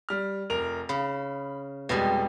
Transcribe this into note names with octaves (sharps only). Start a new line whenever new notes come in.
G3 F6
F1 A#4 F7
C#3 B5
F1 B2 G3 G#3